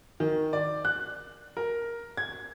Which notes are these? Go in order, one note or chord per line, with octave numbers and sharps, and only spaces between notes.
D#3
D5
F#6
A#4
G#6